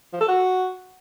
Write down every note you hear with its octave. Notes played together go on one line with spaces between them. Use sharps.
F3
A4
F#4